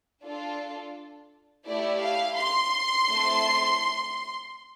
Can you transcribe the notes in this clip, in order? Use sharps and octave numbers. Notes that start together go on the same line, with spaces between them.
D4 F4 A4
A3 E4 G4 D5
F5
C6
A3 C4 E4